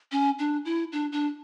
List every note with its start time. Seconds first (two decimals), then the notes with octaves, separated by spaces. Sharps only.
0.12 C#4
0.39 D4
0.65 E4
0.92 D4
1.12 D4